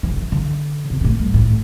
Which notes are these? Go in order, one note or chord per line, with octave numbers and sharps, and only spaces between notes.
E3
D3
E3
D3
C3
B2
A2
G2
A2